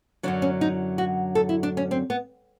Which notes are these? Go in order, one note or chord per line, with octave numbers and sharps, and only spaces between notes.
F#2 D3 F#3 D4
C#4
D#4
F#4
A4
E4
D4
C#4
C4
B3